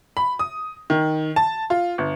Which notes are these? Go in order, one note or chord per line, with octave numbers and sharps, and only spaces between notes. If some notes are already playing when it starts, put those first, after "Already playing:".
B5
D#6
D#3
A5
F4
G1